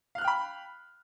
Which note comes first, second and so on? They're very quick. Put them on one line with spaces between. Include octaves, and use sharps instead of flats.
F5 F#6 F6 G5 B5